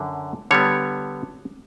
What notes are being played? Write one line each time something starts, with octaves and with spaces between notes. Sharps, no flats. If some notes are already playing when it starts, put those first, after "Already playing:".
Already playing: F#2 D3
D3 G3 B3 C#5